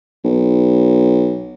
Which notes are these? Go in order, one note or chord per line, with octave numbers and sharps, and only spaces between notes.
B1